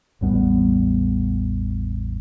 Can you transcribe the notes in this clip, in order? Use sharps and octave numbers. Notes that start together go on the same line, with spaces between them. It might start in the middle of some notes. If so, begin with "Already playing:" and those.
A1 E2 G3 B3